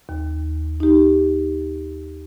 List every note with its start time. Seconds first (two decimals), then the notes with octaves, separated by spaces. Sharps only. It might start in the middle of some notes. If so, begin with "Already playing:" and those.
0.09 D#2
0.80 D#4 G4